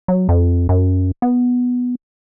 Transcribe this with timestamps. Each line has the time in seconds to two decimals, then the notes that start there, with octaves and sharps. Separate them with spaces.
0.08 F#3
0.29 F2
0.69 F#2
1.22 B3